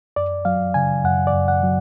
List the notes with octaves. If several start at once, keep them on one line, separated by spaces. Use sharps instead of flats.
F#2 D5
F#3 F5
C#3 G#5
F#2 F#5
D5
F#2
F#5
F#3